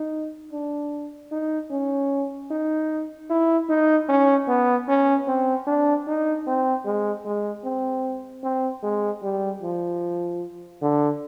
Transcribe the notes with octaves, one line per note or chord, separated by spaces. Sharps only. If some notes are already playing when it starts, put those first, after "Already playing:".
Already playing: D#4
D4
D#4
C#4
D#4
E4
D#4
C#4
B3
C#4
C4
D4
D#4
C4
G#3
G#3
C4
C4
G#3
G3
F3
D3